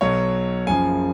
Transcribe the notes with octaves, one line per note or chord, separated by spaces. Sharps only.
B1 B2 F#3 C#5
F#1 F#2 C#3 F3 G#5